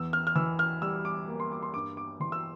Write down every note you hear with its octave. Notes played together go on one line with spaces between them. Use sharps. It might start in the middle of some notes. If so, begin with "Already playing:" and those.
Already playing: E2 E6
F6
F6
E3 E6
F6
G3 E6
D6
A#3
C6
D6
C6
G2 D6
D6
E3 C6
E6